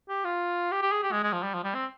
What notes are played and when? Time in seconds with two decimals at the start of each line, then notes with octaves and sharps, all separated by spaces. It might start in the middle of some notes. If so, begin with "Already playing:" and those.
0.09 G4
0.25 F4
0.72 G4
0.82 G4
0.92 G#4
1.03 G4
1.12 G#3
1.23 G#3
1.33 F3
1.43 G3
1.54 F3
1.64 G3
1.75 C4